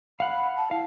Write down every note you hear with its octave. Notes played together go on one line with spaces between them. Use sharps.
F5 F#5 B5
A5
E4 F5